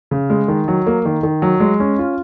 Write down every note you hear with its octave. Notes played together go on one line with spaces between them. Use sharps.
C#3
G#3
D#3
F#3
A#3
D#3
D#3
F#3
G#3
C#4
F4